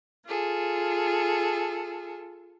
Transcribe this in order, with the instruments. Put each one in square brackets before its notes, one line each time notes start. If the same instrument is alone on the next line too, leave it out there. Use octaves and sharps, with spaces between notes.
[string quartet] F4 G#4 A4